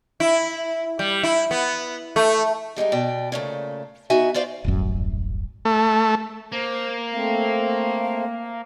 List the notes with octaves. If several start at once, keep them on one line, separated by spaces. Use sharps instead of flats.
E4
G3
E4
B3
A3
G3 G#3 C4 D#4
B2 D5 G5
A#2 C#3 A3
B3 D#4 F#4 E5 G#5
F4 C5 D5 F5
D#1 A1 F#2
A3
A#3 C5
A3 C4 F5